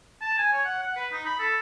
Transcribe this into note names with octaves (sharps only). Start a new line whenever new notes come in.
A5
G#5
C#5
F#5
F#5
B4
D#4
B5
A4